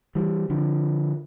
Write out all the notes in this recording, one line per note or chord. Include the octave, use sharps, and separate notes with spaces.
E3 G3
D3 F3